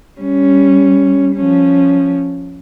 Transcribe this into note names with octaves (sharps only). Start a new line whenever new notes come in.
G3 C#4
F3 C#4